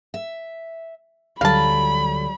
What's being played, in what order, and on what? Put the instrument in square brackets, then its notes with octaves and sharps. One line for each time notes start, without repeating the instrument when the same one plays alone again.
[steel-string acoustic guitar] E5
[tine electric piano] D2 D3 A4 [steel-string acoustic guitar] F#3 G3 [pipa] F5 A5 [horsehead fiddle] B5